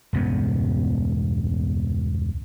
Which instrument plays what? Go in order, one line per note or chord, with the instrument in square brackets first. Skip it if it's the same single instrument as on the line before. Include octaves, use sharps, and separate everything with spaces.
[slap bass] E1 C#2 G2 B3